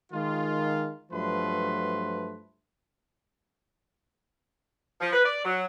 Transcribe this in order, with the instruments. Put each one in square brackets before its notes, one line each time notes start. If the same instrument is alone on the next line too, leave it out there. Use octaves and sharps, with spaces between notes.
[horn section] D#3 G#3 F4
G2 F3 F#3 A3 B4 C6
[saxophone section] F3
B4
D5
F#3